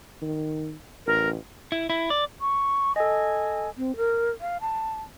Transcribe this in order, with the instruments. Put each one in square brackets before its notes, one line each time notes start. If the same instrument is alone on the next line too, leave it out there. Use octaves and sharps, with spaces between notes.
[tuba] D#3
[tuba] A1 [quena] A#4
[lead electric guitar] E4
E4
D5
[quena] C#6
[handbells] A4 D#5 [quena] G#5
[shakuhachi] C4
A#4
F5
A5